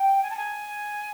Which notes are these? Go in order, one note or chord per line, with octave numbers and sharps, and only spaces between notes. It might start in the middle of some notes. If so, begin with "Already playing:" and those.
Already playing: G5
G#5
A5
G#5